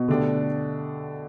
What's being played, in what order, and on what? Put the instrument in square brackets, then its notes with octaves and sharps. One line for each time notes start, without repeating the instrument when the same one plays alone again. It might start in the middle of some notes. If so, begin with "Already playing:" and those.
Already playing: [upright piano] B2
[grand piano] D3 A3 D4 G4